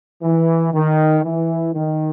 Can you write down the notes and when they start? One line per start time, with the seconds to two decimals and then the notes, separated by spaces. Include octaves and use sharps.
0.23 E3
0.73 D#3
1.24 E3
1.74 D#3